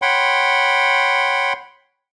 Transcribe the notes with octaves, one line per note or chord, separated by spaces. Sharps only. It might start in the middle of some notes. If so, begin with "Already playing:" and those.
C#5 F#5 G5 B5 C6